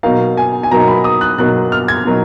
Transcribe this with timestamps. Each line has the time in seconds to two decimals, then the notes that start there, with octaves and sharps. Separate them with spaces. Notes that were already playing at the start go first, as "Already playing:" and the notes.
0.03 B2 F#3 A#3 D#4 F5
0.37 G#5
0.63 G#5
0.71 B2 F#3 A#3 D#4 A#5
0.88 B5
1.04 D#6
1.21 F#6
1.38 B2 F#3 A#3 D#4 F#6
1.72 F6
1.88 G#6
2.05 B2 F#3 A#3 D#4